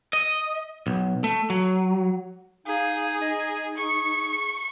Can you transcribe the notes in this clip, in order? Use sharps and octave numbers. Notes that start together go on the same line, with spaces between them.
D#5
B1
A3
F#3
D#4 G#4 F5
D#4 D#5
G#4 C#6